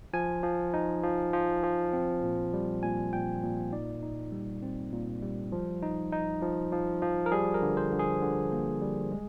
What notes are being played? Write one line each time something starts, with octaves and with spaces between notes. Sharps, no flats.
F3 G#5
F3
D#4
F3
F3
F3
C4
A#2
G3
A#2 G#5
A#2 G5
A#2
D#4 D5
D#4
G3
C4
A#2
G3
F3
D#4
D#4
F3
F3
F3
A#4
G3 G#4
A#4
D3
C5
D3
G#4
D3
A#3
G3
G#3